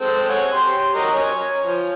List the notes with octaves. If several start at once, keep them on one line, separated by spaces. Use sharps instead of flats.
G#3 C4 A4
C#5 F#5 G#5
G4 C6
F#3 A#4 D#5
C#5 G#5
F3